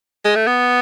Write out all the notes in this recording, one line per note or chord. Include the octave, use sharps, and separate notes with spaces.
G#3
A3
B3